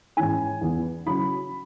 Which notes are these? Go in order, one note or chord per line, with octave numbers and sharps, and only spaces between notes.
G#2 E3 C#4 E4 G#5
E2 E3 B3 E4
C#3 F#3 E4 B5